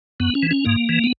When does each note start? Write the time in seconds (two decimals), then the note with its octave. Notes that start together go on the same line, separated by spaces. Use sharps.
0.20 F#2 B3
0.35 C#4
0.43 E3
0.51 C#4
0.65 G#2 A#3
0.89 E3
1.04 B3